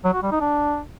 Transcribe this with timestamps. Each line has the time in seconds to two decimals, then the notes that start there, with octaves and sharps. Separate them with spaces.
0.05 F#3
0.14 F#4
0.23 G3
0.32 D#4
0.41 D4